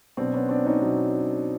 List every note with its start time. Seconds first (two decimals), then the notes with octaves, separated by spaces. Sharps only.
0.17 B2 F#3 C4 D4
0.33 B3 C#4
0.49 C4 D4
0.65 C#4 D#4
0.81 B2 F#3